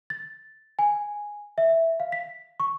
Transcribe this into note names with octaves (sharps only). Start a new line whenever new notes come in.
A6
G#5
E5
F5
B6
C#6